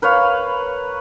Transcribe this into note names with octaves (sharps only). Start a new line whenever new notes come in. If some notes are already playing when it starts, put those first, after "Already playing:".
A#4 B4 C#5 F5